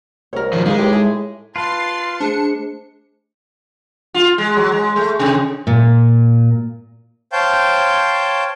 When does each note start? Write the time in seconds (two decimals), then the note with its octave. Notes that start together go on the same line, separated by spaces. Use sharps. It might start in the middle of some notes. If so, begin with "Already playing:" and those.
0.33 C2 A#4 C#5
0.53 D#3 F3 F#3
0.66 G#3 A#3 D#4 B4
0.78 A2 G4
0.93 G#4 E5
1.56 F4 B4 A5 C6 A6 C7
2.20 A3 D4 G#4 C5 C#7
4.14 F4
4.38 G#3
4.56 F#3
4.72 G#3
4.96 A3
5.19 C3
5.67 A#2
7.32 C5 C#5 F5 G5 A5 G6